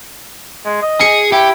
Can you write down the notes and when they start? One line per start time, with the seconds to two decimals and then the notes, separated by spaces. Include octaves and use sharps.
0.65 G#3
0.82 D#5
1.01 G#4 C#7
1.32 E4 G4